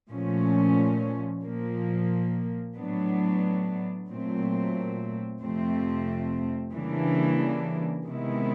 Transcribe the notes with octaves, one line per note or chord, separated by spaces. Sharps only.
A#2 F3 A3 C#4
A#2 F3 A#3
A2 F#3 B3 D4
A#2 F#3 A3 C4
F2 C3 F3 A3 C4
C#3 E3 G3 A#3 D4
C3 D#3 G#3 B3 E4